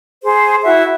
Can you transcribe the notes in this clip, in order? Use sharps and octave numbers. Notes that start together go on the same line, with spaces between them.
G#4 C5
E4 F#4 E5